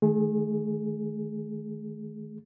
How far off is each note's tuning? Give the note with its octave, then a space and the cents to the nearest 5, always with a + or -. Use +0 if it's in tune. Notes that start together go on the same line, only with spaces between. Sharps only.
D#3 +0 A3 -35 G#4 +0